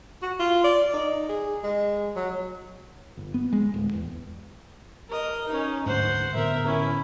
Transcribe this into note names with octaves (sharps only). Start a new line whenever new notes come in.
F#4
F4
D5
D#4
G#4
G#3
F#3
G1
B3
G#3
D1
E2
A#4 D#5
C#4 D#4
D2 G#2 C5 F#5
A2 D3 B3 A#4 E5
C#4 E4